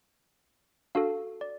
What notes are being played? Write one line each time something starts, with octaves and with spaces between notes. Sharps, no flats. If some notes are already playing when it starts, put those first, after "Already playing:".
D4 F#4 A4 F5
D5